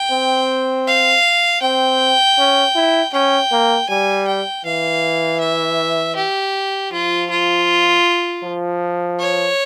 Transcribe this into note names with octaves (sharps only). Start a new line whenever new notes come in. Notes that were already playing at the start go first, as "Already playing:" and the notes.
Already playing: G5
C4
F5
C4 G5
C#4
E4
C#4 G5
A#3
G3 G#5
G5
E3 F5
E5
G4
F3 F4
F4
F3
C#5